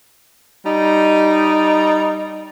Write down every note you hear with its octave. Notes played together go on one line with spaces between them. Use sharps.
G3 D#4